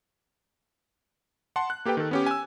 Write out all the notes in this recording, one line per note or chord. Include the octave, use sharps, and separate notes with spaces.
F#5 A5 C6
F#6
A#3 G4 A4 B4 G5
D#3 A4
B3 C#4 G4
G#5 E6